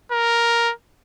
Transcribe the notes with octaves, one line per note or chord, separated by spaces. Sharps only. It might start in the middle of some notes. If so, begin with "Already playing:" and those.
A#4